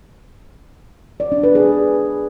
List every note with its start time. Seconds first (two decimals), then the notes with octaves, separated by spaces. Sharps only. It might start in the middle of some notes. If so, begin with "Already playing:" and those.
1.20 D5
1.32 D4
1.43 B4
1.55 G#4